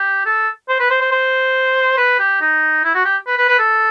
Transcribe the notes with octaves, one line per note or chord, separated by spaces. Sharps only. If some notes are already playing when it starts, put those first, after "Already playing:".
Already playing: G4
A4
C5
B4
C5
C5
C5
B4
G4
D#4
E4
F#4
G4
B4
B4
B4
A4